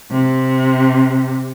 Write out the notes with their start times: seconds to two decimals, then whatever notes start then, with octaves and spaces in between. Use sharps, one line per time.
0.10 C3